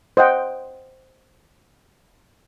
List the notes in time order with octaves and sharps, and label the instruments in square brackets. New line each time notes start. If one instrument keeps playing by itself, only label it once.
[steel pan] C5 D#5 F#5 G5